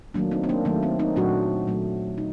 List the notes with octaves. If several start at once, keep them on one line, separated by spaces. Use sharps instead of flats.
D#3 F#3 A3 A#3 D4
C4 D#4
C4
A#3 D4
D#3 F#3 A3 A#3
C4
C4 D#4
A#2 F#3 A3 D4 F#4
A#2 F#3 A3
D#4